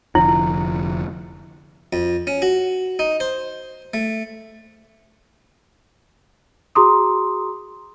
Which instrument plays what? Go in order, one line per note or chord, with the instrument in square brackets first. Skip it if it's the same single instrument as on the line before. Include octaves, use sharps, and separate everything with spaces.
[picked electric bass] F1 D3 F3 [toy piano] E4
[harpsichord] F2
C#4
F#4
D#4
C5
A3
[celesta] F#4 G#4 A#5 C6 D6 D#6